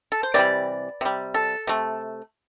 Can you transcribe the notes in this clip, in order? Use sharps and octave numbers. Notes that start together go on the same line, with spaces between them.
A4
C5
C3 E3 G3 D5
C3 G3
A4
C3 A3